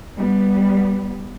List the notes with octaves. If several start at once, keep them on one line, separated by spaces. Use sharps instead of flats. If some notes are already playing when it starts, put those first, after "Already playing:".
G3 B3